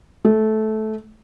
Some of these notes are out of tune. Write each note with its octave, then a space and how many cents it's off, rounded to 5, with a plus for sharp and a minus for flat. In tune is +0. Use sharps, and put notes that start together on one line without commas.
A3 -15